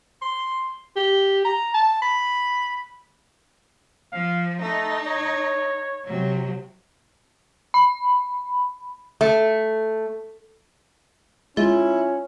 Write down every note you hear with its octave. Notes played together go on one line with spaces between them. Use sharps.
C6
G4
A#5
A5
B5
F3 F5
A3 D#4
C#5
C3 F#3
B5
A3
G#3 C#4 E4 F4